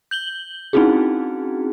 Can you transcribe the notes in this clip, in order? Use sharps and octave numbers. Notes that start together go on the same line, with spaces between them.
G6 F#7 G7
C4 C#4 D#4 E4 F#4 G#4